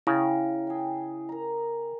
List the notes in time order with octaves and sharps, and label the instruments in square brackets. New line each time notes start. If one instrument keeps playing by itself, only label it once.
[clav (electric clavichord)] C#3 [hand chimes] E4 [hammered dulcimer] G5
[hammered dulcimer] G#4 G5
A#4 A#5